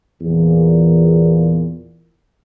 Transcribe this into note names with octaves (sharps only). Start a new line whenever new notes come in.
E2 A#2